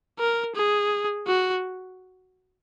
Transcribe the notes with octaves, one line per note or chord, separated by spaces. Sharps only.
A#4
G#4
F#4